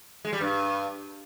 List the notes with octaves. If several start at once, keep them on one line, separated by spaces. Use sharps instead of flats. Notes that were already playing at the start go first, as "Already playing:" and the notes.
G#3
G3
G2